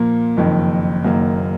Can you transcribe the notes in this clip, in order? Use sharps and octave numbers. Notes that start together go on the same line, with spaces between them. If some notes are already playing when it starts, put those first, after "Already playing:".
Already playing: A#2 F3 A#3
F#1 F2 D#3
F#1 F#2 D#3 A#3